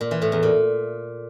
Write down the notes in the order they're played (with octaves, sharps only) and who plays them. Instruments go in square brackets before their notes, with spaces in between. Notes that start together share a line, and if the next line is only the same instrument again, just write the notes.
[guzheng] A#2
E3
A2
E2
A#2